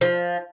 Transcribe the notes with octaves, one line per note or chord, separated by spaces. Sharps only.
F3